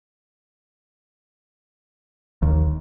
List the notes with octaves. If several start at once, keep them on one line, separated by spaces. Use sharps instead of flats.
D#2